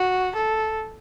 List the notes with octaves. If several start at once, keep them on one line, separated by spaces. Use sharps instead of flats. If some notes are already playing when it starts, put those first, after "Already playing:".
Already playing: F#4
A4